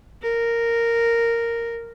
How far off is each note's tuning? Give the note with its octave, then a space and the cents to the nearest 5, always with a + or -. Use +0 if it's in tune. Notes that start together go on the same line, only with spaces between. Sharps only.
A#4 -5